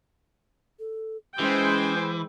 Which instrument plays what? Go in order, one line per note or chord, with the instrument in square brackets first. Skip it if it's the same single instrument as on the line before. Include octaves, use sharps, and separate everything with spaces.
[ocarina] A4
[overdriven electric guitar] E3 [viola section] G#3 C5 G5 [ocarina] C#4